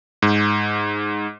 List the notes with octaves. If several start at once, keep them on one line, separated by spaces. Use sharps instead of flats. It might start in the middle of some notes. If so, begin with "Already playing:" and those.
G#2